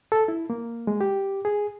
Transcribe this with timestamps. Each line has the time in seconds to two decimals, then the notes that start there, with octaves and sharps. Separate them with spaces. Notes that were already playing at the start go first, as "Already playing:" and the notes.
0.12 A4
0.28 E4
0.50 A#3
0.87 G#3
1.01 G4
1.45 G#4